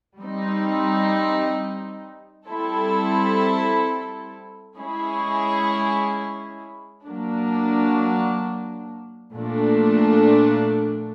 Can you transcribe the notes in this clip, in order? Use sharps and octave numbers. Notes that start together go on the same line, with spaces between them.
G3 C4 D#4
G3 C4 E4 A4
G#3 C#4 E4 G#4
F#3 A#3 D4
A#2 F3 A3 D4